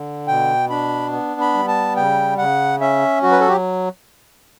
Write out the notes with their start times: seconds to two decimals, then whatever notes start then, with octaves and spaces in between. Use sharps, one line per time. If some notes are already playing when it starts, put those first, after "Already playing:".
Already playing: D3
0.28 B2 G5
0.69 D4 B5
1.12 B3
1.41 B5
1.54 G3
1.68 A5
1.96 C#3 G5
2.38 C#3 F#5
2.81 C#4 E5
3.23 F#3 F#4
3.32 B4
3.40 A4
3.48 G4